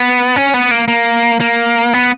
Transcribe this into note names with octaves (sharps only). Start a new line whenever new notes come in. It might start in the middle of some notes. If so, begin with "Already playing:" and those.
Already playing: B3
C#4
B3
A#3
A#3
A#3
B3